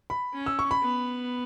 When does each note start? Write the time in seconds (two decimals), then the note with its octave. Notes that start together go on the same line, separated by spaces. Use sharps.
0.10 B5
0.34 C#4
0.46 E6
0.59 C#6
0.71 B5
0.82 B3